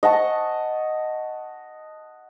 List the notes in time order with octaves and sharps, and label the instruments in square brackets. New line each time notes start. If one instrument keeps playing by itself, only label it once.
[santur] D#5 F#5 A5 C#6